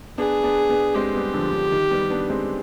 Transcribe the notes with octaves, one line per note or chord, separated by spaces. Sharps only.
B3 D4 G#4
B3 D4
B3 D4
G#3 C4 G4
G3 B3
D3 F3
D3
D#3
G3 B3
B3 D4
G#3 C4